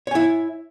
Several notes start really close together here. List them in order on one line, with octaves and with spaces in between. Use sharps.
C#5 G#5 E4